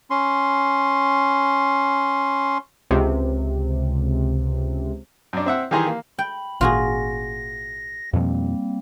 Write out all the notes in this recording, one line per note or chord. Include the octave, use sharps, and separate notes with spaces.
C#4 C6
C#2 C3
F#2 D4
C4 E5 F#5
D#3 E3 G4 G#4 A#5 C6
A#3
G5 B5
G#1 A#2 F4 F#4 G#4 A#6
F2 B2 F3 G3 A#3 C4